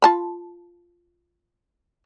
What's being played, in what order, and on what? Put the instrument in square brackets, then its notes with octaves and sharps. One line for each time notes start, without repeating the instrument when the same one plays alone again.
[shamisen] F4 A5 B5